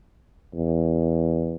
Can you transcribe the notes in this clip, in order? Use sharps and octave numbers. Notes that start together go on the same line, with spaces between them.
E2